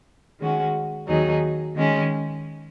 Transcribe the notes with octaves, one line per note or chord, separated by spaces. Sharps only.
D#3 G#3 C#4 F#4
D#2 D#3 F#3 D#4 G#4
D#3 G#3 C#4